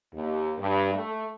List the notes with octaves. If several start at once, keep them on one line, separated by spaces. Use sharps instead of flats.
D#2
G2
A3